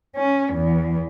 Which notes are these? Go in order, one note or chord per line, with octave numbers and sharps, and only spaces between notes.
C#4
E2